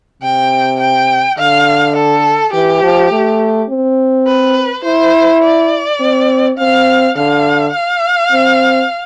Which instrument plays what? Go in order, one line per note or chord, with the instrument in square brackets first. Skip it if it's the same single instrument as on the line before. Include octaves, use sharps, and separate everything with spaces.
[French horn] C3 [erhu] G5
[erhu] G5
[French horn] D3 [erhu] F5
[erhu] A4
[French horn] E3 [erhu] G4
[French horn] F3
A3
C4
[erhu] B4
[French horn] E4 [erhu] C5
[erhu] D5
[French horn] C4
[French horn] C4 [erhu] F5
[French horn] D3 [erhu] F5
[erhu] F5
[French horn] C4